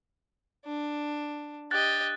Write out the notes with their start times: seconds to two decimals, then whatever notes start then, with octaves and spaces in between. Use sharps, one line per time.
0.65 D4
1.71 G4 D#5 F#6 A6